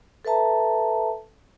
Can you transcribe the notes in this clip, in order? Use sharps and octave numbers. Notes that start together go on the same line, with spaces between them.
A4 B4 E5 A5 A#5